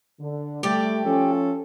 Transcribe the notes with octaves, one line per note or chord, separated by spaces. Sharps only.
D3
G3 A3 G4 D5
F3 C#4 A4